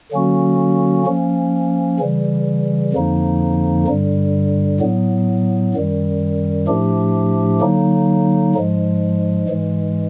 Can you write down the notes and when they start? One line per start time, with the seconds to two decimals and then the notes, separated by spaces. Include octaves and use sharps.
0.12 D3 F#3 A#3 C#4 F#4
1.06 F3 A#3 C#4
1.99 C#3 E3 G3
2.93 F2 D3 F3 A#3 D#4
3.87 G2 D3 G3
4.80 A2 F#3 B3
5.74 F#2 D#3 G3
6.67 A2 F3 A3 D4 G4
7.61 D3 F#3 A#3 D#4
8.55 G#2 F3 G#3
9.48 G#2 E3 G#3